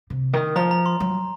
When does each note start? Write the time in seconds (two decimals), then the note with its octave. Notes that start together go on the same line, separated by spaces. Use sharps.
0.10 C3
0.33 D#3
0.55 F3 A#5
0.71 A#5
0.86 C6
1.00 F#3